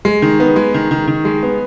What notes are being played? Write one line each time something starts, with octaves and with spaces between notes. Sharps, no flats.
G#3
D#3
B3
G#3
D#3
D#3
D#3
G#3
B3